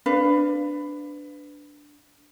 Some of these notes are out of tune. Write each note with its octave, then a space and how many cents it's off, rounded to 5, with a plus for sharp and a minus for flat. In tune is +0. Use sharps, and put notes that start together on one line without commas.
D4 +0 B4 +20 F5 +0